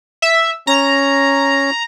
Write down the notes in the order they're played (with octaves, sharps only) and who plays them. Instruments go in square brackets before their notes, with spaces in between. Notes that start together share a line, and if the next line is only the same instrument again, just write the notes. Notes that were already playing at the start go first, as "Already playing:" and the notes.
[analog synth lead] E5
[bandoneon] C#4 [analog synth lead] A#5